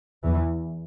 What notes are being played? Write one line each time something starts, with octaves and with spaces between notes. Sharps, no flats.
E2 E3